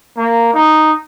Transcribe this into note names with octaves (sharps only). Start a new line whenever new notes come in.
A#3
D#4